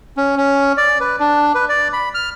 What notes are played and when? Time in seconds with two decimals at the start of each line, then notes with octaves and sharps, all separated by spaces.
0.17 C#4
0.37 C#4
0.77 D5
1.00 B4
1.19 D4
1.55 B4
1.69 D5
1.93 B5
2.14 F6